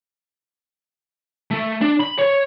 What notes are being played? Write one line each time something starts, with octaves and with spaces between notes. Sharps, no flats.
A3
D4
B5
C#5